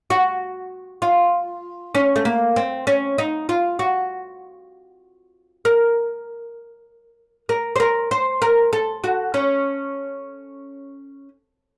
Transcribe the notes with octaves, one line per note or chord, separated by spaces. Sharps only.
F#4
F4
C#4
A3
A#3
C4
C#4
D#4
F4
F#4
A#4
A#4
C5
A#4
C5
A#4
A4
F#4
C#4